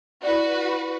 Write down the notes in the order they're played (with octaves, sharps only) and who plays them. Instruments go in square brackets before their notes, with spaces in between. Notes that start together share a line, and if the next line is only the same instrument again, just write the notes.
[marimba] E4 D5 [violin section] F#4 B4